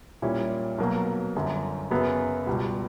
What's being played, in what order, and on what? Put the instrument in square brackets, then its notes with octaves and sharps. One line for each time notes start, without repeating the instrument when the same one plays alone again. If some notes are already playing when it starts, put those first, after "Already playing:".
[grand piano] A#2 G3 C#4 E4
B1 B2 F#3 A#3
G1 F#2 D3
F#2 C#3 F#3 B3
C#2 B2 G3